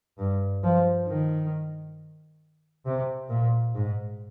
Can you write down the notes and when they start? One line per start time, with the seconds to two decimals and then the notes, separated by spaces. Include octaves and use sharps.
0.18 G2
0.63 F3
1.08 D#3
2.86 C3
3.30 A#2
3.74 G#2